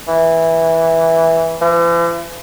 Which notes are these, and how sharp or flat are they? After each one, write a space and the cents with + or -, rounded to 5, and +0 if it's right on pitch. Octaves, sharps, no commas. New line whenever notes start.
E3 -10
E3 +45